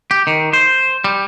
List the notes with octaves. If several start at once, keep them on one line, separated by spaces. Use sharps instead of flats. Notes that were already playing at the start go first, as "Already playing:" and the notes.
G4
D#3
C5
G3